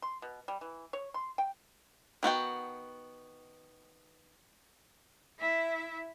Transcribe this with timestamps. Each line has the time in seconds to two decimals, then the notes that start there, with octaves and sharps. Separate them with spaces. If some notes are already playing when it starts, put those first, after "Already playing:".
0.02 C6
0.22 B2
0.48 G3
0.61 E3
0.93 C#5
1.14 C6
1.38 G5
2.23 D#3 B3 F#4 G5
5.39 E4 E5